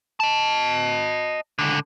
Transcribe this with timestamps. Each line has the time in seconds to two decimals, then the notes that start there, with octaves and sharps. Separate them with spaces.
0.20 D#5 A5
1.59 C#2 D3